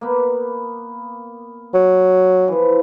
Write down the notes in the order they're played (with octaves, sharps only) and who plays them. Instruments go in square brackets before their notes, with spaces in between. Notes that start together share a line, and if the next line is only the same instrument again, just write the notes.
[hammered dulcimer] A#3 B3
[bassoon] F#3
[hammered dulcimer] E3 F3